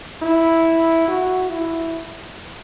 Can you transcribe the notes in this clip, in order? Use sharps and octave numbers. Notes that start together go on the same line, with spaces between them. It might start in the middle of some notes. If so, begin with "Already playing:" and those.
E4
F#4
E4